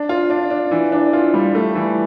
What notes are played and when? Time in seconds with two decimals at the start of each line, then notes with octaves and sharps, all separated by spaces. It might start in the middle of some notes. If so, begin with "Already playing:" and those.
Already playing: D4
0.09 F4
0.30 D4
0.50 D4
0.71 E3
0.92 D4
1.13 F4
1.34 G3
1.55 A3
1.75 E3